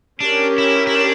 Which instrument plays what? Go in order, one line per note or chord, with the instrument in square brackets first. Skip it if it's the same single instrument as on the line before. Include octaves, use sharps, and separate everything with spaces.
[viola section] C#4 G4 A#4 [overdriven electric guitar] D4
[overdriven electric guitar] E4
E4
D4